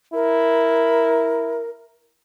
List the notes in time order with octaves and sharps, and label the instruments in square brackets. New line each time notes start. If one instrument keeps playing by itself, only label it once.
[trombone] E4 [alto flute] A#4